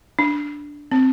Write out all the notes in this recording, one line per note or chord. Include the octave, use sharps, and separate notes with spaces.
D4
C4